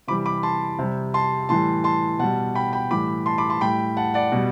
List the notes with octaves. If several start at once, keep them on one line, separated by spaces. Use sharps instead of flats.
C3 E3 G3 B5 D6
B5 D6
A5 C6
C3 G3
A5 C6
A2 E3 G3 A5 C6
A5 C6
B2 G3 F#5 A5
G5 B5
G5 B5
A2 E3 G3 B5 D6
A5 C6
B5 D6
A5 C6
A2 G3 G5 B5
F#5 A5
D5 F#5
B2 G3